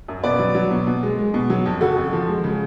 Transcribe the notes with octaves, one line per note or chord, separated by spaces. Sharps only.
F#2
B2 B4 D5
F#3
F#3
B2
B2
G#3
G#3
B2
F#3
F2
C#3 F#4 A4
F2
F3
G#3
C#3